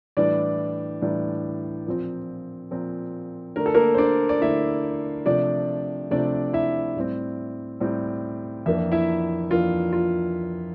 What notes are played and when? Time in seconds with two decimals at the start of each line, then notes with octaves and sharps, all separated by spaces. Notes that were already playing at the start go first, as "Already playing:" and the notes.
0.17 A2 E3 G3 D4 D5
1.01 A2 E3 G3 D4
1.86 A#2 F3 C4
2.71 A#2 F3 C4
3.56 D3 A3 D4 A#4
3.66 A4
3.74 A#3 A#4
3.94 C5
3.98 D4 D5
4.29 D5
4.41 D3 A3 D4 E4 E5
5.26 C3 F3 A3 C4 D4 D5
6.11 C3 F3 A3 C4 D4 D5
6.53 E4 E5
6.97 A2 G3 C4
7.80 A2 G3 C4
8.66 F2 E3 A#3 D4 E5
8.92 E4 E5
9.51 F2 E3 A#3 D4 F4
9.93 F4